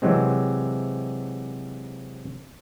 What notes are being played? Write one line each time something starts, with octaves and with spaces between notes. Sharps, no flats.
C3 E3 F#3 G#3 C4